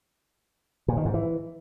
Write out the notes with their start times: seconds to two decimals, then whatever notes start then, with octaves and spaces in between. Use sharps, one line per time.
0.88 A#2
0.97 D#3
1.05 G#2
1.14 E3